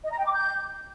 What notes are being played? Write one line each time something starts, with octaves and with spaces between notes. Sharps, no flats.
D#5
A#5
G5
D6
G6